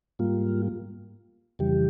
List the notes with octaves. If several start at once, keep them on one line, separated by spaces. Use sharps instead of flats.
G#2 G3 A#3 F4
F2 C#3 E3 G3 G4